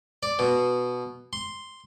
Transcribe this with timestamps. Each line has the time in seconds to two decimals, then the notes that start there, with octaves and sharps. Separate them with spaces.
0.23 D5
0.39 B2
1.33 C6